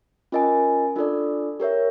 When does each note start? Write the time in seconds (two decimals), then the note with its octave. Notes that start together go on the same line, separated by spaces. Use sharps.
0.32 C#4 F4 A#4 D#5 G#5
0.96 D4 F4 A4 D5
1.60 G4 A#4 C#5 E5